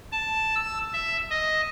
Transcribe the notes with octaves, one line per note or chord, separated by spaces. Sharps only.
A5
E6
E5
D#5